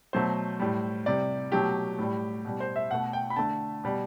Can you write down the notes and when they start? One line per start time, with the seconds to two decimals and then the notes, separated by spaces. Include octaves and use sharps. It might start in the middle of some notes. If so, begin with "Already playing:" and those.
0.13 B2 F#3 A3 C5
0.59 A2 G3
1.06 C3 G3 D5
1.52 B2 F#3 A3 G4
1.99 A2 G3
2.45 B2 G3
2.60 C5
2.76 E5
2.91 B2 A3 F#5
3.13 G5
3.30 B5
3.36 D3 A3 A5
3.84 B2 G3